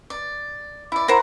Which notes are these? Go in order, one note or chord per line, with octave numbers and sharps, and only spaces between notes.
D5
E4 D5
E4 A#4 C5 F#5 A#5